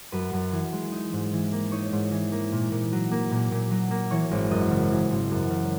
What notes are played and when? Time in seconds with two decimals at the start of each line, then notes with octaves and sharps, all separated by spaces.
0.12 F#2 B4
0.33 F#2
0.52 E3
0.73 G#3
0.92 D#4
1.13 G#2
1.33 E3
1.53 A#3
1.72 D#4 C#5
1.93 G#2
2.11 E3
2.32 A#3
2.52 A#2
2.72 A#2
2.92 F#3
3.11 A#3
3.32 A#2
3.52 A#2
3.71 F#3
3.91 A#3
4.11 E3 C#5
4.31 G#1
4.51 F#2 D#5
4.71 C#3
4.91 E3
5.11 G#1
5.31 F#2
5.50 C#3